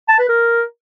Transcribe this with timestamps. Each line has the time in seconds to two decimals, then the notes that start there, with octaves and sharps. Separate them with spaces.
0.09 A5
0.19 B4
0.29 A#4